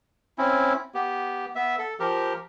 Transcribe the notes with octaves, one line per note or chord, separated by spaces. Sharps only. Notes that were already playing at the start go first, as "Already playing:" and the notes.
C4 C#4 E4
B3 G4
B3 E5
A4
F3 G4 A#4